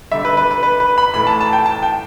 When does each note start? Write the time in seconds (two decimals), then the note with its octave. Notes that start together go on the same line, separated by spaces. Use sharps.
0.12 D3 G3 E5
0.25 B4
0.37 B4
0.51 B4
0.63 B4
0.80 B4
0.98 B5
1.14 A2 E3 A3 B5
1.27 A5
1.41 A5
1.53 G5
1.66 A5
1.83 G5